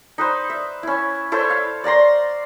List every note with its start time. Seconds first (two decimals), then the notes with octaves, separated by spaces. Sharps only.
0.18 D#4 B4 C5
0.50 E5
0.83 C#4 E4
1.32 E4 A4 C5 C#5
1.50 F5
1.84 D5 F5 A#5 C6